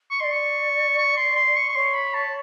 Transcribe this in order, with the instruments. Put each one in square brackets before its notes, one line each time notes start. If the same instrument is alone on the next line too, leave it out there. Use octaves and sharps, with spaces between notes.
[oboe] C#6
[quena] D5 D#5 [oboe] C6
[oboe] C#6
C#6
C6
C6
C#6
C#6
[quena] C#5 [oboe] C6
[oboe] B5
A5